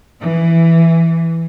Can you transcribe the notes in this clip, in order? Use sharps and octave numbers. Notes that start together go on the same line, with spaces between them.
E3